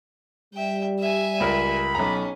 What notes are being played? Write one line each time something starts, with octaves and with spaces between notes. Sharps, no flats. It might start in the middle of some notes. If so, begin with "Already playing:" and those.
G3 E5 G5
E5 G#5
C#2 A#4 B5
B1 C#4 A#5